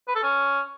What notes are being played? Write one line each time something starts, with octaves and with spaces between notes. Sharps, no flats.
B4
A4
C#4